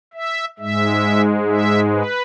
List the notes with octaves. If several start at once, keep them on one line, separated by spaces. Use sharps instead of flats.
E5
G#2 G#3 E5
E5
B4